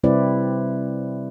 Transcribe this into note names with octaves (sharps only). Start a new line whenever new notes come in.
C3 G3 C4 E4 B4 D5